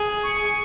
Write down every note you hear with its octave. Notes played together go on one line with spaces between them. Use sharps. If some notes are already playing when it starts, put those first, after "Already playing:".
Already playing: G#4
C#6